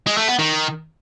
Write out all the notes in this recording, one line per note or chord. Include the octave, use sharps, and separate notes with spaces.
G#3
A3
B3
D#3